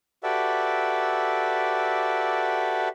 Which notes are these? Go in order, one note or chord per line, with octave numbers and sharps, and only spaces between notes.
F#4 G4 A4 B4 D5 E5